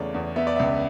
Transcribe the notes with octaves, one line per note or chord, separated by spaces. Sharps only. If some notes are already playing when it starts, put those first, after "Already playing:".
Already playing: E2 C#3 A3 C#5 D5
E2
B3 E5
D5
C#2 E5